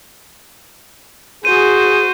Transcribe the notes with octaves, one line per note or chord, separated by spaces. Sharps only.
F#4 G#4 C5 D#7